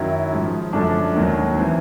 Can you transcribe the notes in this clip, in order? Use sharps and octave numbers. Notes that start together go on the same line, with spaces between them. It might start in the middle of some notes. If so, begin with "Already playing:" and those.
Already playing: F#2 D#3 F#3 E4
G#2 F3
F#2 D3 F3 D4
D#2 D#3 F#3
C4
E3